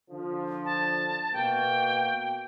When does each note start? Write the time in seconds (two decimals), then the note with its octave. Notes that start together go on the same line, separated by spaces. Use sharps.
0.11 D3 F3
0.65 A5
1.33 B2 A#3 F#4 G5